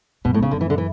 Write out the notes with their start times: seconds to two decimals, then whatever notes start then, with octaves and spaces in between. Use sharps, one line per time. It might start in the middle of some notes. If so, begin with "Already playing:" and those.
0.25 F#2 B2
0.34 A2
0.40 E2 C#3
0.51 F#2 D3
0.61 E3
0.70 D3
0.78 E3